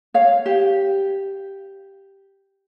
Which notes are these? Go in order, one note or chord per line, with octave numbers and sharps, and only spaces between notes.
C#5 F5
G4